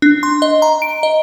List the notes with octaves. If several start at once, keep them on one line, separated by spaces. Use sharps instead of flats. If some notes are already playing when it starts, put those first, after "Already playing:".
D4
C6
D#5
A#5
D7
D#5